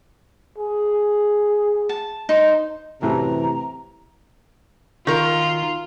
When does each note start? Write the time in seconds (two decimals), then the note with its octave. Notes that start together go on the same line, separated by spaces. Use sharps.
0.58 G#4
1.89 A5
2.29 D#4 C5
3.02 F#2 A2 C3 E3 A#5
5.07 D#3 F4 A#4